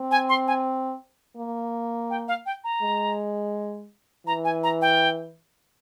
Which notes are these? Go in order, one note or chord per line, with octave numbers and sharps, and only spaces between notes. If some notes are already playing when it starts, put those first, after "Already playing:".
Already playing: C4
G#5
C6
G#5
A#3
G5
F5
G5
A#5
G#3
E3 A#5
G#5
A#5
G5